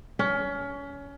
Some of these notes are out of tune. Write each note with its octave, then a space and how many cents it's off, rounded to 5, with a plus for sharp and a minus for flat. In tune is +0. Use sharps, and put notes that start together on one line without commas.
C#4 +25